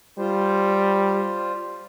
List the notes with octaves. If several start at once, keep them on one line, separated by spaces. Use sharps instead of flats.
G3 F4 C5